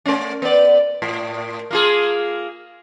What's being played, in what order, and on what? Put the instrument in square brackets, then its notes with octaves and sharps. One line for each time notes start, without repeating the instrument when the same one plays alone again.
[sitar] A3 C#4
B3 D5
A2
A#3 F4 G#4